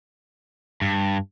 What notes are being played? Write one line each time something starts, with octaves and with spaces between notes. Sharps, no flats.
G2